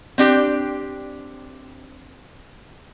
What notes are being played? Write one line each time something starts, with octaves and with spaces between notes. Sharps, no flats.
C4 D4 G4